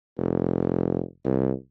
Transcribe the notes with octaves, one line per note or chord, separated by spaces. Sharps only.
F1
C2